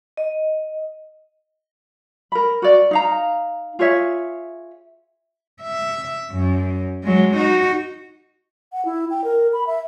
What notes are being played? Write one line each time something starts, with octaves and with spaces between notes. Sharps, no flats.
D#5
A#4 B5
F#4 D5
D#4 F5 A#5
F4 G#4 C#5 E5
E5
F#2
F#3 G#3
D#4 F#4
F#5
E4
G5
A#4
B5
E5